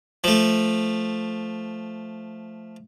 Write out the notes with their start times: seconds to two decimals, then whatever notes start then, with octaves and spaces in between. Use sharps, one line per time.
0.24 F3 A3